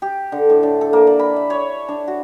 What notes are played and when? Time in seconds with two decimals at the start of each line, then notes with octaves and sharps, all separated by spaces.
0.02 G4
0.32 D3
0.50 A2
0.63 D4
0.81 A4
0.93 A#3
1.07 D5
1.19 B5
1.36 E5
1.50 C#5
1.88 D4
2.08 F#4